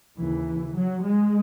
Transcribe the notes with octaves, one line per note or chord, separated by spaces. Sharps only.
D#2 C#3 E3
F#3
G#3